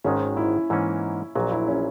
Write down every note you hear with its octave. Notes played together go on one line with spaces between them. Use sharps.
G#1 G#2 D#3 G#3 C#4
E4
G#2 E3 A#3 C#4
A#1 A#2 F#3
E4
C#4